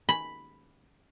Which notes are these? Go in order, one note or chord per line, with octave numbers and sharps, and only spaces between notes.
B5